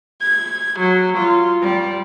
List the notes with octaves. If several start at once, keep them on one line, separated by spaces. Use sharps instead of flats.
G#6
F#3
F4
G3